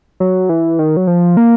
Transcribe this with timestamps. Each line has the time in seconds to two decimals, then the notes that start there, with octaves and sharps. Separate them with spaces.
0.20 F#3
0.49 E3
0.79 D#3
0.97 F#3
1.07 F3
1.37 A#3